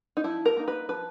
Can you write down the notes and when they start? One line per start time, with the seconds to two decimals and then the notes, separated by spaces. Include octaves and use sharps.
0.17 D#4
0.24 F3 E4
0.45 A#4
0.57 A#3 D#4
0.68 B4
0.89 F3 B4